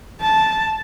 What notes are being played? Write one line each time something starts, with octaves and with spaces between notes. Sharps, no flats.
A5